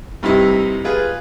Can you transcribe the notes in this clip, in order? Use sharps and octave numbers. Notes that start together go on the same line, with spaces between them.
G2 C3 D#4 E4
F4 G#4 B4